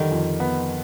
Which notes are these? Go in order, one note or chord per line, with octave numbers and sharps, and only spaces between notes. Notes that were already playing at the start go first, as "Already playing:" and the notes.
Already playing: F2 D3 D#3 G3
F2
B3